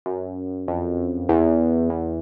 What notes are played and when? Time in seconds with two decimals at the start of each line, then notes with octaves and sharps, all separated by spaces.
0.06 F#2
0.68 F2
1.29 E2
1.90 E2